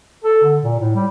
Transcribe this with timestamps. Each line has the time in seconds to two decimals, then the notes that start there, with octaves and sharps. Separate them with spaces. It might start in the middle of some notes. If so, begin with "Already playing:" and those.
0.24 A4
0.44 D3
0.63 A#2
0.79 A2
0.95 G3